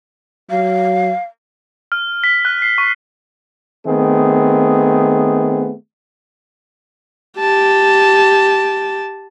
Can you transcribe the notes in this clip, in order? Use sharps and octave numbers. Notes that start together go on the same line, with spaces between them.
F#3 F5
F6
B6
F#6
C7
C#6
D#3 A3 B3 C4 G#4
G4 A5